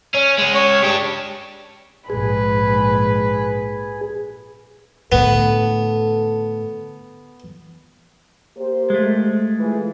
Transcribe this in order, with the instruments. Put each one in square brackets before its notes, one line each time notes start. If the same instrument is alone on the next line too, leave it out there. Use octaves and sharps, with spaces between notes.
[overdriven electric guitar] C#4
G#3 C#4
[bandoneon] C#5
[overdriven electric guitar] D4 G4
[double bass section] A#1 G#2 [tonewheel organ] G#4 [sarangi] B4
[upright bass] A2 D3 [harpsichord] B3 [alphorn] A4
[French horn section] A#3 G4 C5
[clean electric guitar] G#3 A3
[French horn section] E3 F4 G#4